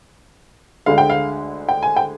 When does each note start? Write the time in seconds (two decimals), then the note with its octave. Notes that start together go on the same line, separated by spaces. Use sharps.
0.86 D2 D3 G#3 F5
0.98 G5
1.10 F5
1.69 G5
1.83 G#5
1.97 G5